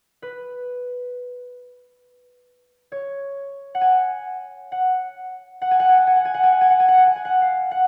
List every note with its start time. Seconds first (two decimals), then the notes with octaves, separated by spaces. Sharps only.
0.22 B4
2.92 C#5
3.75 F#5
3.81 G#5
4.72 F#5
5.62 F#5
5.71 G#5
5.80 F#5
5.89 G#5
5.98 F#5
6.07 G#5
6.16 F#5
6.25 G#5
6.34 F#5
6.43 G#5
6.52 F#5
6.61 G#5
6.70 F#5
6.80 G#5
6.88 F#5
6.98 G#5
7.07 F#5
7.16 G#5
7.25 F#5
7.42 F5
7.71 F#5